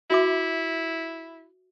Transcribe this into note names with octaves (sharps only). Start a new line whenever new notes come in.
E4 F#4 E5 D6